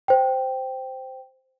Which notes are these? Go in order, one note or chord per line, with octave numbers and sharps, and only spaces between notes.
C5 G5